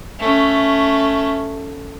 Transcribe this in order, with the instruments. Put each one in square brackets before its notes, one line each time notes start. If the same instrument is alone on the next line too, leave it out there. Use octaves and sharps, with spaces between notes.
[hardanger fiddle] A3 C#4